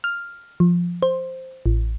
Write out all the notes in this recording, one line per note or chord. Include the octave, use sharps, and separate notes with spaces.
F6
F3
C5
A1